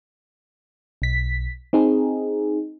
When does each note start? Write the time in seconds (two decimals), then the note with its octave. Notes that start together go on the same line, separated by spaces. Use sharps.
1.02 B1 B6
1.73 C4 D#4 G#4